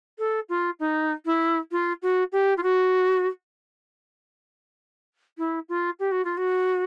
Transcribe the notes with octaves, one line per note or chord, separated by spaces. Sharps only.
A4
F4
D#4
E4
F4
F#4
G4
F4
F#4
E4
F4
G4
F#4
F4
F#4